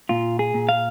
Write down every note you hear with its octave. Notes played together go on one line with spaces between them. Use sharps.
A#2 F4
G#4
A#2
F5